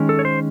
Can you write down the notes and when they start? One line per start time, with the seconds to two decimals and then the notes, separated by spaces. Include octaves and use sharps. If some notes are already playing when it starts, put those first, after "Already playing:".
Already playing: D#3 G#3 C#4
0.09 A4
0.19 C#5
0.25 C5